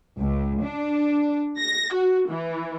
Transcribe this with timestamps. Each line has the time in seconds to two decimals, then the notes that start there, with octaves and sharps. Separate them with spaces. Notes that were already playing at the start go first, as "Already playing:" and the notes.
0.21 C#2
0.63 D4
1.59 A#6
1.93 F#4
2.30 E3